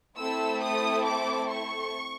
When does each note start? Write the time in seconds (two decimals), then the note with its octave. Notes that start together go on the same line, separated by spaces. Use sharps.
0.18 A3 C4 E4 A4 E6
0.62 D#6
1.05 D6
1.49 C#6